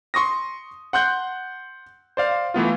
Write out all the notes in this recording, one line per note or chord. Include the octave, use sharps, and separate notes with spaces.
C6 C#6 D#6 A#6
F#5 C6 F#6 G6
C5 D5 F5
E3 A3 B3 F4